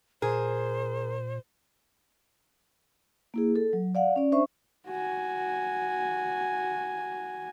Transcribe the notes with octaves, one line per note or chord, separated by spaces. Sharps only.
A#2 G#4 A#4 C5
A#3 E4 G#4
A4
F#3
D5 F5 F#5
C#4 D5
D4 C5 E5 C#6
F#4 G#5